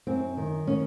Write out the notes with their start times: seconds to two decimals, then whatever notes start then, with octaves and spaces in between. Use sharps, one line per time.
0.07 F#2 C4
0.37 D#3
0.67 C#4